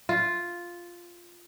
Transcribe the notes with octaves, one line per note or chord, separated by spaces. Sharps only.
F4